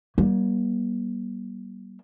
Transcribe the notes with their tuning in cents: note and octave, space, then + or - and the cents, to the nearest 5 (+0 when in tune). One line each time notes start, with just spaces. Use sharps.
G3 -25 A#3 +40